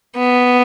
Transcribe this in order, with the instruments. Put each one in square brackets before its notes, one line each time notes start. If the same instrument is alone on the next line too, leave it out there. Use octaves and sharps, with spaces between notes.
[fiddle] B3